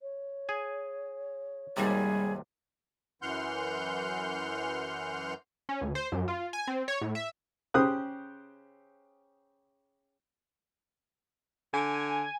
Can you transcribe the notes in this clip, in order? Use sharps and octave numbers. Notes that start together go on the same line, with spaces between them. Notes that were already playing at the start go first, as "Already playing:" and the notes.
C#5
G#4 G#5
G#1 D#2 C3 G3 G#4
F#2 E3 F#5 C6 F6 G6
C#4
D2
C5
F#2
F4
G#5
C4
C#5
A2
E5
C#3 G4 C5 D#6 F#6
D3 G#5